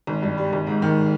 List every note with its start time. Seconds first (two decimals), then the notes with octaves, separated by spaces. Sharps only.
0.07 G#1
0.23 G2
0.38 G3
0.53 G#1
0.67 G#2
0.82 D#3